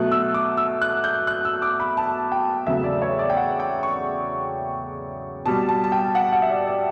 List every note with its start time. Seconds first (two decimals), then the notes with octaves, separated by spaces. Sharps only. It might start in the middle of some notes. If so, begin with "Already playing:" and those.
Already playing: B2 F#3 A3 F#6
0.12 E6
0.34 D6
0.57 E6
0.82 F#6
1.04 G6
1.27 F#6
1.45 E6
1.62 D6
1.80 B5
1.97 A5
2.32 G5
2.67 E2 C#3 F#3 A3 E5
2.84 D5
3.02 C#5
3.19 D5
3.30 G5
3.37 F#5
3.60 G5
3.83 C#6
5.46 B2 G3 A5
5.69 A5
5.84 A5
5.92 G5
6.15 F#5
6.33 F#5
6.42 E5
6.50 D5
6.67 D5